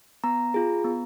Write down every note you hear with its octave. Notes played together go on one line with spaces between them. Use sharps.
B3 A#5
F4 G#4
B3